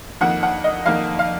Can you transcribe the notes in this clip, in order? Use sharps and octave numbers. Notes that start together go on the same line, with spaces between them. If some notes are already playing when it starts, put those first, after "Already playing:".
F2 D#3 A#3 F#5
F#5
D#5
F2 D#3 A#3 F5
F5